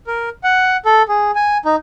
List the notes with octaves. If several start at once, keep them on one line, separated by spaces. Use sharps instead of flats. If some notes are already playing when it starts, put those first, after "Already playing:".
A#4
F#5
A4
G#4
G#5
D#4